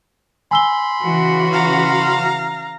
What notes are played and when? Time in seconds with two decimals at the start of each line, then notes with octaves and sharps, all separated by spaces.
0.51 G#5 B5 C6 E6 G7
1.03 C#3 E3 F#4
1.53 F5 A#5